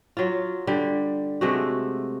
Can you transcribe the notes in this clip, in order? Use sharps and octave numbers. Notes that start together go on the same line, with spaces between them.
F#3 F4
D3 G3
C3 G#3 A3 F#4